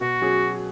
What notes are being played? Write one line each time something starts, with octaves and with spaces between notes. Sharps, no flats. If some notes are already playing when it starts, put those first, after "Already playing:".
B2 F#4
F#3 C#4 G#4